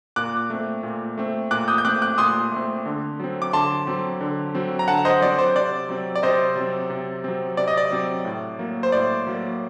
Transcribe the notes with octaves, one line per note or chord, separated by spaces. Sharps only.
A#2 D6 F#6
A3 C4
A#2
A3 C4
A#2 D6 F#6
D#6 G6
G6
A3 C4 D6 F#6
D6 F#6
A#2 C6 D#6
A3 C4
D3
F#3 C4
D6
D3 A5 C6
F#3 C4
D3
F#3 C4
A#5
D3 F#5 A5
C5 D#5
F#3 C4 D5
C5
C3 D5
F#3 C4
D5
C3 C5 D#5
F#3 C4
C3
F#3 C4
C3 D5
D#5
D5
F#3 C4
A2
F#3 A#3
C5
A2 D5
F#3 A#3